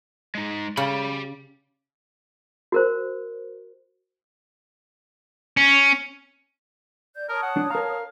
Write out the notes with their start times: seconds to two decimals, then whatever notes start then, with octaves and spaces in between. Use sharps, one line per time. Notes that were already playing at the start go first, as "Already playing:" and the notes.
0.35 G#3 D#4
0.77 C#3 G4 B5
2.72 F#4 A#4 C5
5.57 C#4
7.15 D5 G6
7.29 A#4 C#5 A5 D#6
7.43 F#5
7.57 D4
7.70 A#4 F5 A#5